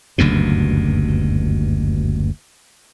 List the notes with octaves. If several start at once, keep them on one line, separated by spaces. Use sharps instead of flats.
F#1 D2 G2 B2